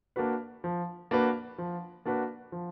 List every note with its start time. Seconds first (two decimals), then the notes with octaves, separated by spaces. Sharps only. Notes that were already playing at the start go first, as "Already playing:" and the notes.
0.16 A#3 D4 F#4 B4
0.64 F3
1.11 A#3 D4 F#4 B4
1.58 F3
2.05 A#3 D4 F#4 B4
2.52 F3